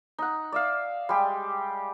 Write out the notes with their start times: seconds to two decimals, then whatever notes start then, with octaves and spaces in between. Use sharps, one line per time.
0.18 D#4 F#5
0.52 D5 E5 F5
1.09 G3 G#3 G4